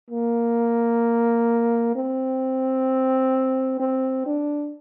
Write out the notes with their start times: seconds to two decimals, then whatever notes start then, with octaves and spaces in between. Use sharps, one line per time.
0.10 A#3
1.95 C4
3.80 C4
4.26 D4